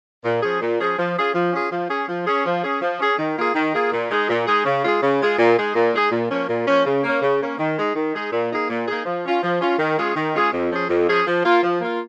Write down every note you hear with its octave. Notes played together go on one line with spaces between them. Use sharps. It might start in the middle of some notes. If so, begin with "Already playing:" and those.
A#2
F3 C#4 G#4
A#2
F3 C#4 G#4
F3
C#4 F4 G#4
F3
C#4 F4 G#4
F3
C#4 G#4
F3
C#4 G#4
F3
C#4 G#4
F3
C#4 G#4
D#3
A#3 F4 G#4
D#3
A#3 F4 G#4
A#2
G#3 D#4 G#4
A#2
G#3 D#4 G#4
C#3
G#3 F4 G#4
C#3
G#3 F4 G#4
A#2
G#3 D#4 G#4
A#2
G#3 D#4 G#4
A#2
F3 A#3 C#4
A#2
F3 A#3 C#4
C#3
A#3 C#4
C#3
A#3 C#4
D#3
G#3 D#4 G#4
D#3
G#3 D#4 G#4
A#2
A#3 D#4 G#4
A#2
A#3 D#4 G#4
F3
C#4 F4
F3
C#4 F4
D#3
G#3 C#4 F4 G#4
D#3
G#3 C#4 F4 G#4
F2
F3 C#4 G#4
F2
F3 C#4 G#4
F3
A#3 F4
F3
A#3 F4